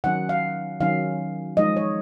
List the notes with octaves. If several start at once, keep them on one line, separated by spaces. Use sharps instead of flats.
D#3 F#3 C#4 F#5
F5
D#3 F#3 C#4 F5
F3 G#3 D#4 D#5
C#5